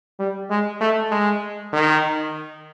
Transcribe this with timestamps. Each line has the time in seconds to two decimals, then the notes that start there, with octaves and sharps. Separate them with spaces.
0.19 G3
0.50 G#3
0.81 A3
1.12 G#3
1.73 D#3